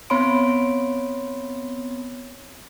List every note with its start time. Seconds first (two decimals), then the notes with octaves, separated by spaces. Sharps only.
0.10 B3 C4 C#5 B5 C6 D7